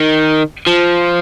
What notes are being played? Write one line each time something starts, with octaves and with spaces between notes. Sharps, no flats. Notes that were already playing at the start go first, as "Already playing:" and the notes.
Already playing: D#3
F3